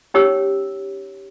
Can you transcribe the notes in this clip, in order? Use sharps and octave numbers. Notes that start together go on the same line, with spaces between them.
C#4 D#4 G4 C#5 E6